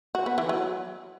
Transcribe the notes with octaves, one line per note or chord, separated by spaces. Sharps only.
F#4
B3
E3
F#3